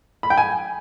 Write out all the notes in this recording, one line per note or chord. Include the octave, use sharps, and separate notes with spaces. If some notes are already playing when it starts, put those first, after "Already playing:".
B5
G5
G#5